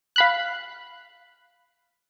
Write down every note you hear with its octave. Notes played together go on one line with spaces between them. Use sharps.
F5 B5 F#6